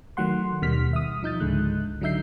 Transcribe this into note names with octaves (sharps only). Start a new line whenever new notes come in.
D#3 F#3 A3 F#5 C6
D#2 B2 D#3 G3 F6 B6
E5 D#6
F3 D#4 G6 A6
C#2 G#2 D3 G#3 F#6
D3 F#3 D#4 E5 G6 C7